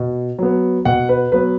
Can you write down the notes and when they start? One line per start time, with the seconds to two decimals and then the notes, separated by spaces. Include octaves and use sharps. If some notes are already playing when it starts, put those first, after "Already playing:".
Already playing: B2
0.39 F#3 B3
0.85 B2 F#5
1.09 B4
1.32 F#3 B3 B4